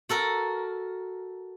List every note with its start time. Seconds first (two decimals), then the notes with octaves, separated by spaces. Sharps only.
0.09 F#4 A4 A#4